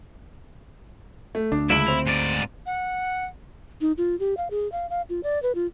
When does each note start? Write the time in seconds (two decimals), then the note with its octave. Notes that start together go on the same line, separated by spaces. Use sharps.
1.35 A3
1.52 D2 D4
1.70 C#2 E4 D7 F#7
1.87 C4 F7
2.07 G#2 D5
2.66 F#5
3.81 D#4
3.98 F4
4.20 G4
4.37 F5
4.51 G#4
4.72 F5
4.90 F5
5.09 F4
5.23 D5
5.43 B4
5.55 F4